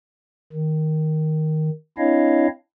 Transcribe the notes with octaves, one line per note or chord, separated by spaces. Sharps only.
D#3
C4 D4 E4 C#5 D#5 F5